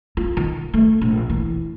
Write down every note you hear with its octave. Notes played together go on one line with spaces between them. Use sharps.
F4
D#3
A3
A#1
E3